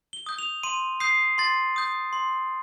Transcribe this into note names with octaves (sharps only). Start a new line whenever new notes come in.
G7
D#6 G6
F7
C6 D#7
D#6 G6 C7
C6 A6
D#6 G6
C6